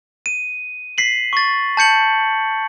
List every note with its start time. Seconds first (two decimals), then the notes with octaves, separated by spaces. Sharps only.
0.26 D#7
0.98 B6 C7 F#7
1.33 C#6 A6
1.77 A5 G6 C#7 F#7